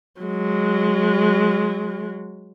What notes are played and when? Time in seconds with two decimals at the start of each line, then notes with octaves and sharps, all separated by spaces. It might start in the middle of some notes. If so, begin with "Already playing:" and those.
0.21 F#3 G#3